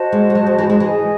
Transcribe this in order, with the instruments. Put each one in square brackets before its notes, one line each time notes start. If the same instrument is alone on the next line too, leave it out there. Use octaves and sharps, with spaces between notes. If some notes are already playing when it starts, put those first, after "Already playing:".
Already playing: [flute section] F#4 C5 D#5 A5
[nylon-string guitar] G#3
G#3
F#3
G#3
E3
G#3
[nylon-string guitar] E3 [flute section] G#4 D#5 G#5